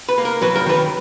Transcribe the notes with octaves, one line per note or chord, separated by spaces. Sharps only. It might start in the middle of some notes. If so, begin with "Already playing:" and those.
B4
A#3
A#4
F#3 B4
A#4
D#3 B4